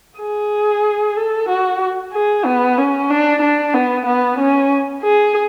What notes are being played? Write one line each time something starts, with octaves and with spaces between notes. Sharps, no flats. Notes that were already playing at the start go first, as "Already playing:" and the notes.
G#4
A4
F#4
G#4
B3
C#4
D4
D4
B3
B3
C#4
G#4